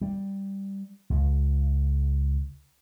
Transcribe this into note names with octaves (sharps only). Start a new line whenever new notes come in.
G3
C#2